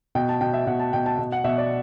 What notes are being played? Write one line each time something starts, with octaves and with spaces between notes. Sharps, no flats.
B2 G5
A5
B2 G5
E5
B2 F#5
A5
B2 G5
A5
B2
F#5
B2 E5
D5